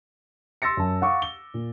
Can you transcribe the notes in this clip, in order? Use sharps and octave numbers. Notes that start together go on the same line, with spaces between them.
C6 E6 A6 A#6 C#7
F#2 A5
F5 F#5 C#6 D6
G7
A#2